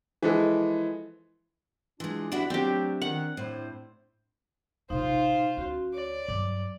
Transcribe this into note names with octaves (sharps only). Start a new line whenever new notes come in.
E3 F3 G#3 A4
E3 G#3 D4 F4
F2 D4 E4 F#4 G4 B5
F#3 A3 C4 D4 G4
D#3 F#5
A2 D4 E4 C5
A1 C3 D#4 F4 C5 F5
D2 C#4 F#4
C#5 D5
G2 F#3 D6